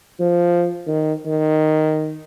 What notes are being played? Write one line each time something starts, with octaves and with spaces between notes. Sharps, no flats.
F3
D#3
D#3